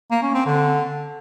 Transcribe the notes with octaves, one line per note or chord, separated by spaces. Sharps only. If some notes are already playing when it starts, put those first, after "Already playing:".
A#3
C#4
C4
D3